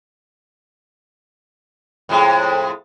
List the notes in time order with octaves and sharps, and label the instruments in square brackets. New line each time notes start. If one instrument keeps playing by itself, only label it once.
[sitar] F2 A2 G#3